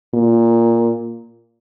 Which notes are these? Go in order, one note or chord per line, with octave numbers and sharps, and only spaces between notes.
A#2